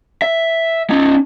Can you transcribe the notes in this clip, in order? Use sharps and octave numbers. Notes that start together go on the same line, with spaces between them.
E5
C#4 D#4